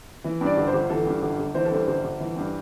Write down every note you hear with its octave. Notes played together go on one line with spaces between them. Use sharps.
E3
G2
D5
G1
C5
G1
E3 A4
G2
G1
G1
E3 C5
A4
G2 C5
G1 C5
G1
E3
G2